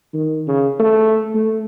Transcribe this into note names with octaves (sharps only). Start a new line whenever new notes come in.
D#3
C#3
A3
A3